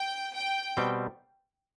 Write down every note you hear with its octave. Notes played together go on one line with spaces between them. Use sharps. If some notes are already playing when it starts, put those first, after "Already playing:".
Already playing: G5
G5
B2 G3 C4